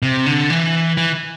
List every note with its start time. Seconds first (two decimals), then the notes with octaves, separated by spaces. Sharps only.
0.02 C3
0.26 D3
0.50 E3
0.97 E3